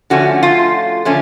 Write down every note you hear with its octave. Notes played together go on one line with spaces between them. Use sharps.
D3 F3 A3 C#4 F#4
F4
D3 F3 A3 C#4